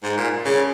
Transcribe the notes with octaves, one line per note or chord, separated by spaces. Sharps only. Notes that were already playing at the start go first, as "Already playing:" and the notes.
G#2
A#2
C#3